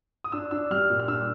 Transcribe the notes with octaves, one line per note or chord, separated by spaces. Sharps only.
D#6
D4 E6
D4 E6
G3 F6
A#2
F6
D4 E6